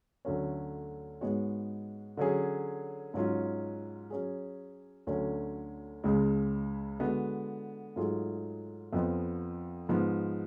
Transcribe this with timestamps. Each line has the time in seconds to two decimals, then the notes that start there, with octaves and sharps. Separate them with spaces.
0.25 D2 D3 F#3 A3 C#4
1.21 G#2 G#3 B3 F#4 C#5
2.17 D3 F#3 C#4 G#4
3.14 G#2 F#3 C#4 F4
4.10 F#3 C#4 G#4
5.07 D2 D3 F#3 C#4
6.04 C#2 C#3 G#3
6.99 D3 G#3 B3 F#4
7.96 G#2 F#3 A3 F4 G#4
8.92 F2 F3 B3
9.89 G#2 F3 B3